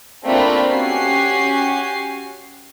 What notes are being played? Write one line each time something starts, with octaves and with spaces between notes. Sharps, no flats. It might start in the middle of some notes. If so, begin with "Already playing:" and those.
A3 A#3 C4 D4 F4 B5
C#4 F#4 G4 G#5 C7